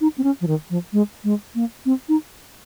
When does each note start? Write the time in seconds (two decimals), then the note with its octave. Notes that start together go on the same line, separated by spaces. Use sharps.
0.01 D#4
0.18 C4
0.24 C#4
0.41 F3
0.47 D#3
0.70 F3
0.93 G#3
1.24 G#3
1.55 A#3
1.86 C4
2.09 D#4